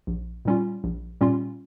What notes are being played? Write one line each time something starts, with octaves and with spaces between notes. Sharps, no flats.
A#1
A#2 G3 C#4 F4
A#1
A#2 G3 C#4 F4